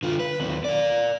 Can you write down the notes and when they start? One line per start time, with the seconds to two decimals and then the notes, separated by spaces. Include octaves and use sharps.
0.03 D3 F4
0.19 B4
0.40 D#2 C4
0.64 A#4 D5